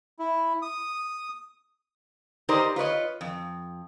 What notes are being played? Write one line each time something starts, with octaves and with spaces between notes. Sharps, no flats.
E4
D#6
D#4 G4 A#4 C5 D5 D#5
F4 B4 C#5 D#5
F2